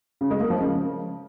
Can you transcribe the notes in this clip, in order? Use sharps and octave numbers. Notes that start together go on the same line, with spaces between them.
C#3
G#3
A#3
F3
C#3